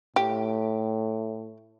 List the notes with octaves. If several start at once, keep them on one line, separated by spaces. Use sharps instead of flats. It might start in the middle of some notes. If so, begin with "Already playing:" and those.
A2 G4